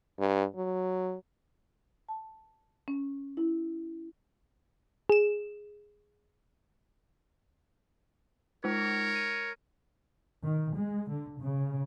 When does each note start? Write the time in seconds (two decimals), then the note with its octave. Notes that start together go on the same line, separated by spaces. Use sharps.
0.19 G2
0.56 F#3
2.09 A5
2.88 C#4
3.37 E4
5.09 G#4 E7
8.64 G#3 D#4 A#4 C#5
9.16 D#7
10.44 D#3
10.76 G#3
11.09 D3
11.38 C#3